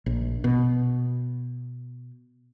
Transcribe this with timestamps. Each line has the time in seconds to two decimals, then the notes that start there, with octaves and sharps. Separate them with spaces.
0.06 A#1
0.44 B2